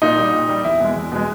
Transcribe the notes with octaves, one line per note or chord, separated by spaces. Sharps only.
A#2 D#4
G3
A#2
G3
E2 E4
B2 G#3
E2
B2 G#3